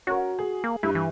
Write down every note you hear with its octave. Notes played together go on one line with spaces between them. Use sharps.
C#4 F#4 A#4
G#4
A#3
G2 E4
E3